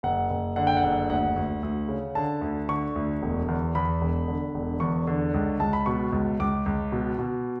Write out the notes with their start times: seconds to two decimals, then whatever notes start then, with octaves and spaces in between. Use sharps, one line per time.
0.03 F#1 F#5
0.30 F#1
0.56 D3 F#5
0.67 G5
0.77 F#5
0.83 F#1
1.10 D2 F#5
1.36 D2
1.63 D2
1.88 C#3
2.15 D3 A5
2.41 D2
2.69 D3 C#6
2.96 D2
3.22 E1
3.48 E2
3.75 E2 B5
4.01 E1
4.28 D3
4.54 E1
4.80 E2 C#6
5.07 D3
5.34 C#2
5.60 C#2 A5
5.73 B5
5.86 B2 C#6
6.12 C#2
6.40 C#2 D6
6.66 C#2
6.92 B2
7.19 B2